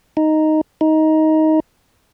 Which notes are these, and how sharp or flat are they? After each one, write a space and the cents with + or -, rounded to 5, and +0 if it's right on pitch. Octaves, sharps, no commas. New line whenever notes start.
D#4 +0
D#4 +15